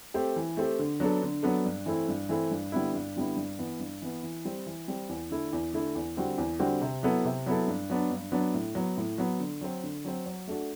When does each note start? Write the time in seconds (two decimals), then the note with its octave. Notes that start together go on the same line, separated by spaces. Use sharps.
0.14 A3 C4 G4
0.36 E3
0.57 A3 C4 G4
0.79 D3
1.00 F#3 B3 D4 A4
1.22 D3
1.43 F#3 B3 D4 A4
1.65 G2
1.86 E3 A3 C4 E4
2.08 G2
2.29 E3 A3 C4 E4
2.51 G2
2.72 D3 G3 B3 E4
2.94 G2
3.16 D3 G3 B3 E4
3.36 G2
3.59 E3 B3
3.80 G2
4.02 E3 B3
4.23 E3
4.45 G3 C4
4.66 E3
4.88 G3 C4
5.09 E2
5.31 D3 A3 E4
5.53 E2
5.73 D3 A3 E4
5.95 E2
6.17 D3 G3 C4 F#4
6.38 E2
6.59 D3 G3 C4 F#4
6.81 C3
7.03 F#3 B3 E4 A4
7.25 C3
7.46 F#3 B3 E4 A4
7.68 G2
7.90 F#3 B3 D4
8.11 G2
8.32 F#3 B3 D4
8.54 A2
8.75 F#3 B3
8.97 A2
9.18 F#3 B3
9.40 D3
9.61 F#3 C4
9.83 D3
10.05 F#3 C4
10.26 F#3
10.48 A3 D4 F#4